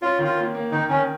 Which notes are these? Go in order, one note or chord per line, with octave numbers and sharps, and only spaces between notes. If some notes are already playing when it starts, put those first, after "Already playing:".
C#4 F4
D#3
F4
A#3
A#3
D#3 D#4
D#3 C#4